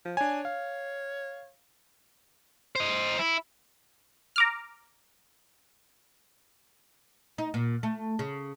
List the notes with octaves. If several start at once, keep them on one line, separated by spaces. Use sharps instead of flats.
F3
D4 C#5 G#5
F5
C5 D#5
E4
A#5 D6 F6
D#4
A#2
A3
C#3